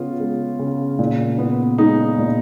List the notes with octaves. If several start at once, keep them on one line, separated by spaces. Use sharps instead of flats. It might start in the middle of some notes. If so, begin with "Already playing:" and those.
Already playing: C#3 B3 C#4 F4
G#3
C#3
A#2
B3
G#3 D#4
A#2